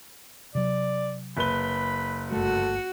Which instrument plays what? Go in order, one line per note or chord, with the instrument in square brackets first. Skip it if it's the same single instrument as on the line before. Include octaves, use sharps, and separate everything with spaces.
[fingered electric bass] C3 F#3 [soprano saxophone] D5
[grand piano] F#1 B4 G7 [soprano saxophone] B5
[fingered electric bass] G1 A3 [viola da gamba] F#4 [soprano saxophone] A4